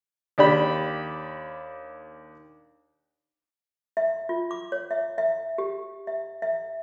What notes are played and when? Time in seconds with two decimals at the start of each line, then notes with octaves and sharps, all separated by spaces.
0.38 D#2 D4 G4 B5
3.97 E5
4.29 F4
4.51 D6
4.72 C#5
4.91 E5
5.18 E5
5.58 G4
6.07 E5
6.42 E5